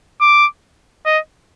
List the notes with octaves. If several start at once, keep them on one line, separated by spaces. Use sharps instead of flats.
D6
D#5